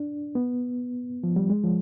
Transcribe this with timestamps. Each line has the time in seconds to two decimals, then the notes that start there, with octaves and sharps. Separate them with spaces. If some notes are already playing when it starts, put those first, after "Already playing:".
Already playing: D4
0.35 B3
1.24 F3
1.36 G3
1.50 G#3
1.64 F3